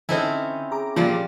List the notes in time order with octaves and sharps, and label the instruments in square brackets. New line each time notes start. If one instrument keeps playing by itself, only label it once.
[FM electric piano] D3 C5 [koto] C4 C#4 E4 [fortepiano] D#4 A4 G#5
[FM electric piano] G#4 A#5 D6
[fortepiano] A#2 [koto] F3 G3 F4